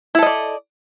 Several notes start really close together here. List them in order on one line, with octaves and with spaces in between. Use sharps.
E4 A4 D#5 D5